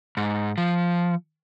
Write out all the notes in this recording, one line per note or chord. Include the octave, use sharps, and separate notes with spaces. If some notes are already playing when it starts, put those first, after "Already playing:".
G#2
F3